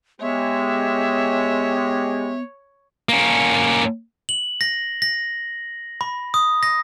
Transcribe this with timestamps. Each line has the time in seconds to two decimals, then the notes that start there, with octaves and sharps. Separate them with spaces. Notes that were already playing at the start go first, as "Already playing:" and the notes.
0.21 G#3 B3 G4 C#5 E5
3.09 A#3 C#4
4.29 F#7
4.61 A#6
5.02 A#6
6.01 B5
6.34 D#6
6.63 A#6